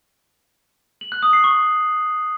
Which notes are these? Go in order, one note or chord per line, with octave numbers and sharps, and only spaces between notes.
F#7
F#6
D#6
C7
C#6